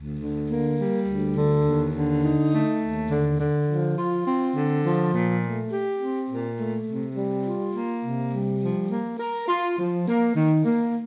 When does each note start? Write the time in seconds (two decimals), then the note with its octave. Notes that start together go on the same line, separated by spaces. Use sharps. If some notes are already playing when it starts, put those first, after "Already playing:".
Already playing: D2
0.19 D3
0.48 A#3
0.77 G3
1.07 D2
1.36 D3
1.64 D#2
1.94 D3
2.22 D#4
2.52 A3
2.80 D#2
3.09 D3
3.39 D3
3.67 F3
3.97 F4
4.25 C4
4.54 D3
4.84 F3
5.13 A#2
5.42 A3
5.70 G4
5.99 C4
6.29 A#2
6.57 A3
6.87 C3
7.15 G3
7.44 F4
7.74 A#3
8.03 C3
8.32 G3
8.61 F3
8.89 A#3
9.19 A#4
9.48 F4
9.77 F3
10.06 A#3
10.34 D#3
10.64 A#3